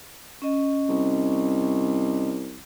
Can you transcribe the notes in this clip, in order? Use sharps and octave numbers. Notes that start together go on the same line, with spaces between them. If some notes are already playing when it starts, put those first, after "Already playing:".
C#4 D#5
C2